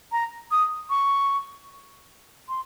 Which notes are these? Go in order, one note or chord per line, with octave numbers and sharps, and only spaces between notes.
A#5
D#6
C#6
C6